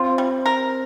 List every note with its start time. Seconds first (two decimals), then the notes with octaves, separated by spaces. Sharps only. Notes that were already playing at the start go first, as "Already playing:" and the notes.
Already playing: C4 F4
0.18 G3
0.46 A#4